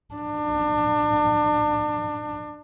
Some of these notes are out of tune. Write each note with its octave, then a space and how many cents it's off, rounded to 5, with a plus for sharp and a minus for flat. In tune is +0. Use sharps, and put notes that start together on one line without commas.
D4 +30